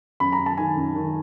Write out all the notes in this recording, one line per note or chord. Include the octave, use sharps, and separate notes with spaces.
F#2 B5
A#5
F#2
A5
D#3 G#5
F#2
D#3